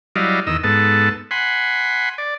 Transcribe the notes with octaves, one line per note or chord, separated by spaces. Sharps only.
F#3 G3 E4 D5 D#5 F5
E2 D#3 D#5 E6
G#2 B3 A4 A5
F#5 G#5 B5 C6
D5